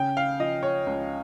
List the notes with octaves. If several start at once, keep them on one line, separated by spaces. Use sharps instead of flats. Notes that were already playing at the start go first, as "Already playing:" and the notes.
Already playing: C#3 G5
F5
F3 D#5
C#5
C#2